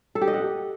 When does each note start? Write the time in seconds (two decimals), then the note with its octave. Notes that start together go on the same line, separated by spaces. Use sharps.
0.15 A4
0.21 G4
0.28 D#5
0.34 F#5